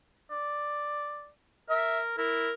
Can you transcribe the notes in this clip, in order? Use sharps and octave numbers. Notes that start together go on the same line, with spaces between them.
D5
A#4 E5
E4 A#4